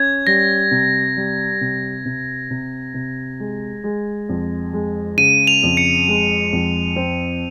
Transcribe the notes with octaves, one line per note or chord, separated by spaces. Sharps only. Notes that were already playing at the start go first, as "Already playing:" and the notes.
Already playing: C#4 G#6
G3 A#6
C3
G3
C3
C3
C3
C3
G#3
G#3
F2
G#3
C#3 D#7
F7
F2
C#7
G#3
F2
C4